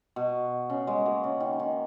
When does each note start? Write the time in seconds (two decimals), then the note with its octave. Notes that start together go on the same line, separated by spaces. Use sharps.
0.16 B2
0.70 C#3
0.87 G#3 B3
1.06 F#3 A#3
1.24 C#3
1.40 D#3
1.59 D#3